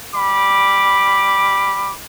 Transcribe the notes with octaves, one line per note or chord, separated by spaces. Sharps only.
G3 B5 D6